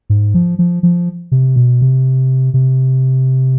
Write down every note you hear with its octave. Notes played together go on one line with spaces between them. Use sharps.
G#2
F3
F3
F3
C3
B2
C3
C3